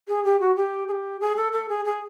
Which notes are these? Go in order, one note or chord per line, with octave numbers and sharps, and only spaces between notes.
G#4
G4
F#4
G4
G#4
G4
G#4
A4
A4
G#4
G#4